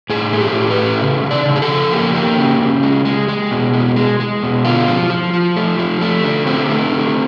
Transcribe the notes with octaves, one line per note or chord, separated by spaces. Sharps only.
A2 G#4
A3
G4
A2
B4
A3
C#3
C#3
D5
C#3
G#4
A4
F3
A#3 G4
A#3
C#3
C#3
G#3
G#3
G#3
B2
G#3
G#3
G#3
B2
D3 F4
F3
F3
F3
A3
F3
A3
D3
A3 C4
A3
D3